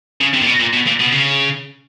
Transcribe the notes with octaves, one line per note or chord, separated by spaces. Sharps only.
C#3
C3
A#2
B2
A#2
B2
A#2
B2
C#3